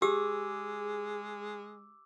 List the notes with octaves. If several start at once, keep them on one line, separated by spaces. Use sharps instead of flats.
G#3 G4 G#4 D6 E6